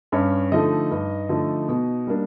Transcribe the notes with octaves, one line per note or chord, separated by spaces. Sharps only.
G2 C#4 C#5
D3 F3 A3 D#4 D#5
G2
D3 F3 A3
B2
G3 A#3 D4